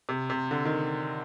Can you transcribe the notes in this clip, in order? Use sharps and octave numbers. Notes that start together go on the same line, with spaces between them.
C3
C3
D3
D#3